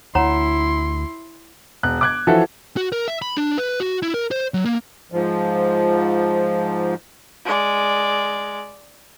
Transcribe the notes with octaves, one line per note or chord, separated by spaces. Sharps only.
D2 E4 C#5 F#5 A#5 C6
E1 F#6
D6 F#6 G#6
E3 F3 E4 F#4 A4
F#4
A#4
E5
B5
D4
B4
F#4
E4
A#4
C5
F#3
A#3
G#2 F3
G#3 D5